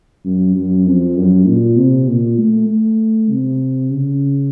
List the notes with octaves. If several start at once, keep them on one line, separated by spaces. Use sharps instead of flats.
F#2
F#2
F2
F#2
A#2
C3
A#2
A3
A3
C3
C#3